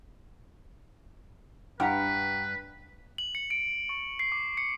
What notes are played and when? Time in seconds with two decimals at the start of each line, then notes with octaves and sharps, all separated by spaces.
1.80 G2 G4 B4 F#5 A#5
3.18 F#7
3.35 C#7
3.50 D7
3.89 C#6
4.19 C7
4.32 D6
4.57 C#7